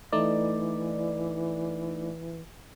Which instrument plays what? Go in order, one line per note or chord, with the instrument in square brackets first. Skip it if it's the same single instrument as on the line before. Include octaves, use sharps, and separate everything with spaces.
[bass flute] E3 [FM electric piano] A3 D#4 D5